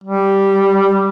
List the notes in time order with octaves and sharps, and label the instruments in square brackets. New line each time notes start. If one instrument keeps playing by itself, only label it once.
[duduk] G3